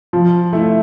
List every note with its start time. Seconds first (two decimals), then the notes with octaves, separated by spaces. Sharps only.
0.13 F3
0.53 A3 E4